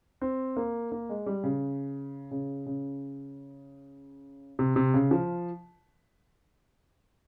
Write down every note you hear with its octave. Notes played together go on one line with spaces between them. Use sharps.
C4
A#3
A#3
G#3
G3
C#3
C#3
C#3
C3
C3
C#3
F3